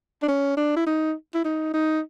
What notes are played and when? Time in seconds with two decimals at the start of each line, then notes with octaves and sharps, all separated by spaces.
0.23 D4
0.28 C#4
0.57 D4
0.76 E4
0.87 D#4
1.34 E4
1.45 D#4
1.74 D#4